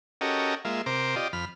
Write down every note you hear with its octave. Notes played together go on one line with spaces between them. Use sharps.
C#4 F#4 G4 A4 A#4 D#5
G#3 A#3 F4 E5
C3 A#4 C5 D6
F4 G4 D5 D#5
F2 B5 F6